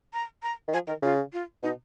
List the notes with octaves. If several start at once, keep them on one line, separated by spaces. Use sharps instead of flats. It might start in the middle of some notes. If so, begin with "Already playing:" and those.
A#5
A#5
D#3
F3 G#5
D#3 A#4
C#3 F4
F4
B2 D#4